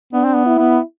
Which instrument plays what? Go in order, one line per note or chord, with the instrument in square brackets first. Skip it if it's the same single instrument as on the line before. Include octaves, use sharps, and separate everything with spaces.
[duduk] B3 [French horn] D4
[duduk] C4
B3
[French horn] E4
[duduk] B3